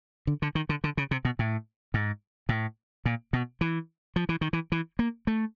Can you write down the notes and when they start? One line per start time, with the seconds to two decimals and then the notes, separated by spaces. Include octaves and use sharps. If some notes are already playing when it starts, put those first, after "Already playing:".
0.27 D3
0.42 D3
0.55 D#3
0.69 D3
0.84 D3
0.97 C#3
1.11 C3
1.25 B2
1.39 A2
1.94 G#2
2.49 A2
3.05 A#2
3.33 B2
3.61 E3
4.16 F3
4.29 E3
4.41 D#3
4.53 E3
4.72 E3
4.99 A#3
5.27 A3